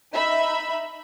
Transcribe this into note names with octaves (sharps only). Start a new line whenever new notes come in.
D#4 E5 B5